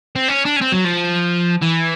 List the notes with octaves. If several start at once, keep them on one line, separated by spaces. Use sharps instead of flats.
C4
C#4
D4
C#4
C4
F#3
F3
E3